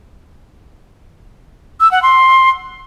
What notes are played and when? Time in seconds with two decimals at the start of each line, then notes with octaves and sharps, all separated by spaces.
1.80 E6
1.91 F#5
2.03 C6